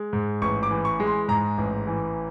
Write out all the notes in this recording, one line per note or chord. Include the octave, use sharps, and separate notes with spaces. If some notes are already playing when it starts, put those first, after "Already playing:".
Already playing: G#3
G#2
A1 C#6
D6
E3
C#6
G#3
C6
G#2 A#5
A1
E3